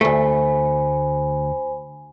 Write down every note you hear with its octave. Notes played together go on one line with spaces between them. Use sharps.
D2 A3 C5 G#5 B5